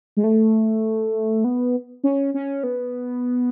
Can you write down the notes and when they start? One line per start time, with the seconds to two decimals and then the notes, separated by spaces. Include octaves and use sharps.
0.17 G#3
0.24 A3
1.44 B3
2.04 C#4
2.34 C#4
2.63 B3